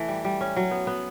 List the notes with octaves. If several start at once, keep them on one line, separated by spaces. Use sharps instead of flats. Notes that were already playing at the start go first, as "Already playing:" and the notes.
Already playing: E3 A3
G3
G3
C#4
F#3
B3
B3